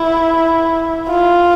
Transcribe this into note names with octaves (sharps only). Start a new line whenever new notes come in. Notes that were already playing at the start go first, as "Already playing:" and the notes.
Already playing: E4
F4